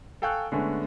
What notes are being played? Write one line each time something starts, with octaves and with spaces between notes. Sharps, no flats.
A4 F5 G5 G#5 C#6 F#6
D3 G#3 A3 B3 C#4